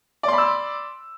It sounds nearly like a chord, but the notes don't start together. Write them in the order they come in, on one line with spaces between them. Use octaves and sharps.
D5 C6 B5 E6